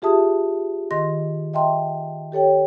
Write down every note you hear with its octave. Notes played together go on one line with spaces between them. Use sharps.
F4 G4 G#4 E5 A5 D#6
D#3 D#5 C6 A#6
D#5 E5 G5 A5 C6
G4 A4 C#5 G5